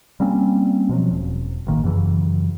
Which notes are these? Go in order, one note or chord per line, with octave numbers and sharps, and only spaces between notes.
G3 A#3 C4 C#4
B2 F3 F#3
E1
A1 D#3 A#3
F#2 C#3 E3 F#3